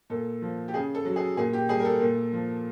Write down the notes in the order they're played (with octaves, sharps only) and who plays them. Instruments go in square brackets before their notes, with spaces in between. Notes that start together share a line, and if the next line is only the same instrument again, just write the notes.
[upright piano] A#2 A4
F3
G4
C#3 G#4
A4
F#3
G#4
A#2 G#4
G4
G3 G#4
A#4
A4
A#2
F3